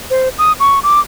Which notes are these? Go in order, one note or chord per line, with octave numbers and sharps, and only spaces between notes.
C5
D#6
C#6
D6